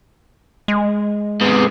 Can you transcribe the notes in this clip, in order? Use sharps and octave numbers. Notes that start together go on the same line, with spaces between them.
G#3
G#2 C3 B3 G#4